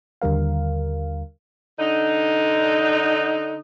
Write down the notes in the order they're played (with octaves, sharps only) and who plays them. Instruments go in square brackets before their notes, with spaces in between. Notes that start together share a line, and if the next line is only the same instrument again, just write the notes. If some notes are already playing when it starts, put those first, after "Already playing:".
[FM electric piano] D#2 D3 G3 A#4 F5
[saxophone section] D3 D#4